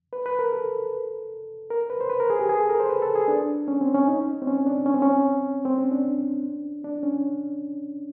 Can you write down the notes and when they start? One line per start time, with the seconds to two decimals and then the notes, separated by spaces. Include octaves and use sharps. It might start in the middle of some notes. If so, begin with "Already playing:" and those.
0.13 B4
0.26 B4
0.39 A#4
0.53 A4
1.70 A#4
1.90 B4
2.01 C5
2.10 B4
2.20 A#4
2.30 G#4
2.39 G4
2.49 G#4
2.60 A4
2.69 A#4
2.80 C5
2.89 B4
3.02 A4
3.15 G#4
3.28 D4
3.68 C#4
3.81 C4
3.95 C#4
4.08 D#4
4.42 C4
4.47 C#4
4.66 D4
4.86 C#4
4.94 C4
5.02 C#4
5.65 C4
5.78 C#4
5.91 D4
6.84 D4
7.03 C#4